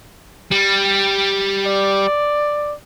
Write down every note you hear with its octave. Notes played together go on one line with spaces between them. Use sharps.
G3
D5